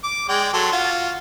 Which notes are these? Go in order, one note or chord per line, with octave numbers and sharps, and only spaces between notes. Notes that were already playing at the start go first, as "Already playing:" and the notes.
D6
G#3 D5 G5
F#3 A4 C6
F4 F#4